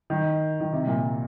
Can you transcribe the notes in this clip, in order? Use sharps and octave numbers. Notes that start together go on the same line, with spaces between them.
D#3
D#3
C3
A#2